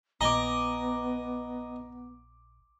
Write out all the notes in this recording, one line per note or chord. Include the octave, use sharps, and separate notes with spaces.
A#1 B3 D#5 G#5 A#5 D6